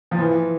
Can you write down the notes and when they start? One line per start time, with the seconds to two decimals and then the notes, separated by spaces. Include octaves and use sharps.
0.11 F3
0.18 E3